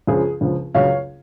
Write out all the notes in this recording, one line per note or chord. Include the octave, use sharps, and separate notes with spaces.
C#2 C#3 F3 G#4
C#2 C#3 F3
C#2 C#3 F#3 C#5 F5